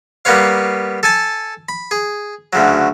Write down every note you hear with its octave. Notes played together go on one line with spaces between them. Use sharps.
G3 A#3 B3 B4 C#5 F5
A4 G#5 A5
B5
G#4
D2 C#3 F#3